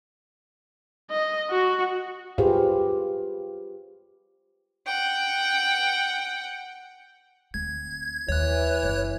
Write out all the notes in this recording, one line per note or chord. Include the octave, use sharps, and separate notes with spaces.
D#5
F#4
F4 G4 G#4 B4 C5 F5
F#5 G5
D2 C4 G#6
D#2 E3 C#5 F#6
F#1